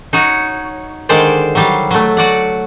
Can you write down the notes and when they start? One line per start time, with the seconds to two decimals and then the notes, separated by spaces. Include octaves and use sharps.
0.13 D#4 F#4 C#5
1.09 D3 D#3 G#3 C5 D5
1.55 F#3 G3 F5
1.91 F#3 A3
2.17 F#4 D5 F#5